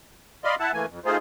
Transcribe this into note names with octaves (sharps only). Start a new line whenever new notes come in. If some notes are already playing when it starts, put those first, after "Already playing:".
D5 D#5 F5 B5 C6
E4 E5 F#5 A5
E3 A3 A#3 G#5
F2
A3 D#4 F4 G#4 C5